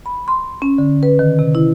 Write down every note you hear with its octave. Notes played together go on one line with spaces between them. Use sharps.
B5
C6
C#4
D3
B4
D#3
C3
E4